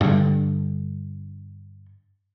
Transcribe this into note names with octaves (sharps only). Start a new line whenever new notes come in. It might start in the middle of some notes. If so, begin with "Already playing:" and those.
G2 D3